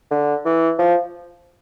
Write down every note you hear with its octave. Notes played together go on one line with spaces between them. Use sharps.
D3
E3
F3